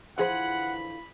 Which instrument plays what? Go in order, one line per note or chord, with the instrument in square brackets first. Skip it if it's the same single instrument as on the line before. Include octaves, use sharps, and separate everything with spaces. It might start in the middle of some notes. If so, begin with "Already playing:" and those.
[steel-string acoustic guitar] D3 E3 F4 [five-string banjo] F3 G#4 C5 [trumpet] F#5 [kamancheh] B5